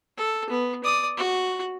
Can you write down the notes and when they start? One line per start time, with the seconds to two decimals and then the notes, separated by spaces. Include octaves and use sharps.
0.17 A4
0.49 B3
0.84 D5 D#6
1.17 F#4